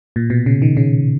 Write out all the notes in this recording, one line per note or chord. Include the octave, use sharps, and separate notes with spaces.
A#2
B2
C#3
D#3
C#3